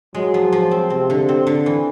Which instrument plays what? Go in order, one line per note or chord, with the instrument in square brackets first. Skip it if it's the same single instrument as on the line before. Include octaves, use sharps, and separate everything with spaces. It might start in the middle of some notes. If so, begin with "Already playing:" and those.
[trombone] F#3 [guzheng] G#3
[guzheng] F3
F3
C4
[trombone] C3 [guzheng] C4
[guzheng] D3
C4
D3
E3